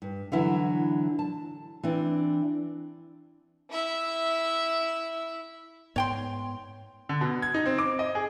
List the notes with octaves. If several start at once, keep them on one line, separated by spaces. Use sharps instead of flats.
G2
D3 E3 F#3 E4
A5
E3 C4 D4
E4 E5
G#2 B3 C#5 G5 C6
D3
B2
G#6
D#4
C4
D6
D#5
G#4